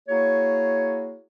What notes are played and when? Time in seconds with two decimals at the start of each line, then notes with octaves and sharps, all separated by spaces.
0.09 A#3 E4 F#4 G#4 C#5